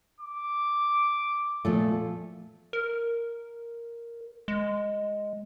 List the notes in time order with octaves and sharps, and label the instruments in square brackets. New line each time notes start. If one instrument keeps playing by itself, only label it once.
[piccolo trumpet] D6
[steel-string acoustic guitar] A#2 F3 A3
[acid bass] A#4
G#3